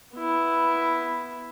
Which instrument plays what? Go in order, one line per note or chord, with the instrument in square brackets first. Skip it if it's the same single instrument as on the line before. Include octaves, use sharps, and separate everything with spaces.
[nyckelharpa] B3 E4